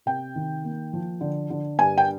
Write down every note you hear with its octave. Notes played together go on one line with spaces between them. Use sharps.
C3 G5
D#3
A#3
F3
D3
D3
G2 G#5
G5